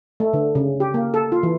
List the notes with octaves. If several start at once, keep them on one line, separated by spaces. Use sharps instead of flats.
A3
D3
C#3
G4
A#3
A4
F4
E3